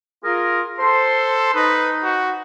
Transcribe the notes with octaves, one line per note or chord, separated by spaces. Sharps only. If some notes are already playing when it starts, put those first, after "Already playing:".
F4 G#4 A#4
A4 C5 C6
D#4 B4
F#4